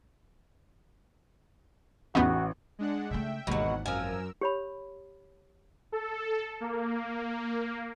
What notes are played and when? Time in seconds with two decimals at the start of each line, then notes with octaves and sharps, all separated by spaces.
2.15 A1 E2 B3 D#4 F#4
2.79 G#3 D4 F#5
3.10 C#3 A3 E5 G5
3.47 G#1 D#2 G#2 B2 E3 F#3 F#5
3.86 F#2 F3 A#4 G#5 E6
4.41 G4 C#5 B5
5.92 A4
6.60 A#3